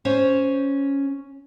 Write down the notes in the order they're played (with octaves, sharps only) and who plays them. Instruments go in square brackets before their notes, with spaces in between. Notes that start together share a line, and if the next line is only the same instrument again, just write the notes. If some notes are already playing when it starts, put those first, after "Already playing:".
[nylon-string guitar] C#4 C5 C#5